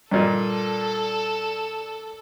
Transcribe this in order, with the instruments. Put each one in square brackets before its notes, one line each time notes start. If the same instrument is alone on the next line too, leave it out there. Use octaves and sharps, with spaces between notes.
[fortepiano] G2 A#2 [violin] A4